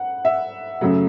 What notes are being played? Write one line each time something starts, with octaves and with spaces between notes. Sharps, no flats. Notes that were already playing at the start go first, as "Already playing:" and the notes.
Already playing: F#5
E5
F#2 C#3 F#3 A3